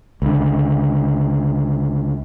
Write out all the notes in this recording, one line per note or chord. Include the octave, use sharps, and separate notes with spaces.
C#2 D3